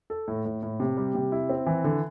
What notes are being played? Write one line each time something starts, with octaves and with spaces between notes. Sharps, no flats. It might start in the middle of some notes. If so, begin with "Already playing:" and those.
A4
A2
A2
A2
C3
G3
C3
E4
C4
E3
D3